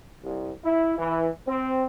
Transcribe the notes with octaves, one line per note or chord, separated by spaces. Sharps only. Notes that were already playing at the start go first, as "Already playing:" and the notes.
C2
E4
E3
C4